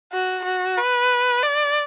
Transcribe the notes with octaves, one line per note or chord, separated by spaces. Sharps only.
F#4
F#4
B4
D5